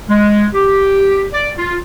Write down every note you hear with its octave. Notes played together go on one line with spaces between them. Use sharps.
G#3
G4
D5
F4